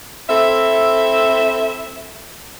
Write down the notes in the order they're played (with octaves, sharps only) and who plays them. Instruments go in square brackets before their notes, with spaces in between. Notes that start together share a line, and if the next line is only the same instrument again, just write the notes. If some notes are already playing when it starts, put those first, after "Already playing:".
[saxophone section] C4 E4 A4 E5